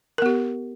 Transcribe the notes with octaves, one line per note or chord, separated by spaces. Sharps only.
B3 G4 A#4